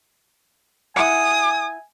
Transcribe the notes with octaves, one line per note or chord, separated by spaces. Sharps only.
E4 F#5 G#5 D#6